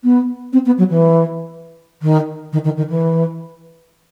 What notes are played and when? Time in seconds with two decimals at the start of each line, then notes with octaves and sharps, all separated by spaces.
0.03 B3
0.52 C4
0.65 B3
0.78 F#3
0.90 E3
2.02 D#3
2.52 D#3
2.64 D#3
2.77 D#3
2.89 E3